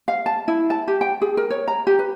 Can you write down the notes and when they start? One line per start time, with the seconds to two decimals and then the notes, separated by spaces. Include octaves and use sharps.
0.08 F5
0.26 A5
0.48 E4
0.70 A5
0.88 G4
1.01 G5
1.22 G#4
1.37 A#4
1.50 C#5
1.68 A#5
1.87 G4
1.99 B4